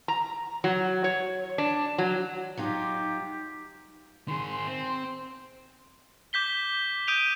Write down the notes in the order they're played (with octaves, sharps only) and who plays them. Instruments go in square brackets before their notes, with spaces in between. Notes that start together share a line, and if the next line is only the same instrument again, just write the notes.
[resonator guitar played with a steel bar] A#5
F#3
C#5
D4
F#3
[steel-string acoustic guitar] F#3 D#4 F4 [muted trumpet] G4
[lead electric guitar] D#3 G#4 [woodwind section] C6
[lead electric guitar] C4
[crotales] D6 G6 B6 G7
D#6 G6 D7 D#7 F7